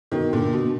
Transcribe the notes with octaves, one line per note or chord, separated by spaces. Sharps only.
B2 D#3
A#2 D3
B2